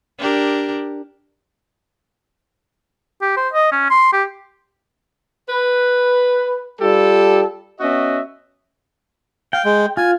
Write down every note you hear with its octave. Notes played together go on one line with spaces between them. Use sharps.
D4 G4 A#4
G4
C5
D#5
C#4
C6
G4
B4
G3 F4 G4 A4
B3 C#4 F#4 D#5 E5
F5 G5
G#3
F4 G#5